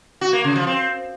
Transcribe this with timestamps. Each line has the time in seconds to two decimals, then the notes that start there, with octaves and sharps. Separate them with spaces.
0.21 F#4
0.33 A#3
0.44 C#3
0.56 F3
0.67 C4